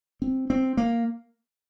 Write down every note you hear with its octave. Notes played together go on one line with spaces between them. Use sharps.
C4
C4
A#3